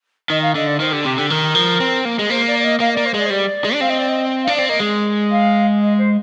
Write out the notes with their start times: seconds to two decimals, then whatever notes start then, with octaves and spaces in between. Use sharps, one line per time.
0.30 D#3 D#5
0.42 F5
0.55 D3 D#5
0.67 D5
0.80 D#3 C5
0.92 D3 G4
1.04 C3 G4
1.18 D3 G4
1.29 D#3 A#4
1.55 F3
1.80 C4
2.05 A#3
2.19 G#3
2.30 A#3 C5
2.47 D5
2.59 D5
2.64 D#5
2.80 A#3 F5
2.93 A#3 D5
3.05 C5
3.14 G#3 D5
3.26 C5
3.30 G3 D5
3.64 G#3
3.73 D4
3.81 C4 F5
3.89 D#5
3.99 D5
4.09 D#5
4.44 D4 F5
4.56 C4 D5
4.69 A#3 D#5
4.80 G#3
5.31 F5
5.82 D#5
5.98 C5